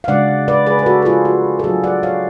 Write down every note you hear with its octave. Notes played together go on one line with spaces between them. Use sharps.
F5
C#3 G#3 D4 D5 F#5
B4 D5
G#4 B4
B4
F#4 A4
A4
F4 G#4
F#4
A4
F#3 A3 D4 F4 G#4
D5 F#5
C#5 F5